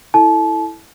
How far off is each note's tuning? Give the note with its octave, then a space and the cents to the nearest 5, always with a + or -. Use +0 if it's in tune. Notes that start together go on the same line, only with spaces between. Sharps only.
E4 -5 A4 +0 A5 -35